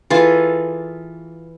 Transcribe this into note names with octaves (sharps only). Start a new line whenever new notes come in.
E3 F4 G#4 A4